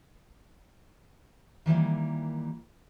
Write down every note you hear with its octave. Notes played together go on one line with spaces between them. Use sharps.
D#3 E3 G3 A#3